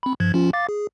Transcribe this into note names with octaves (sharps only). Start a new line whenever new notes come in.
C4 B5
G2 F3 G#6
F3 C#4 F4
F5 D6 A6
G#4